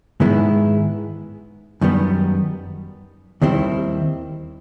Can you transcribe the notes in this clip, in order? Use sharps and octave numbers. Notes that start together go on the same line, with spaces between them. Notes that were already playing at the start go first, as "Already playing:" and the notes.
G#2 D#3 G#3 B3 E4
F#2 D#3 G3 B3
D#2 D#3 G3 C4 E4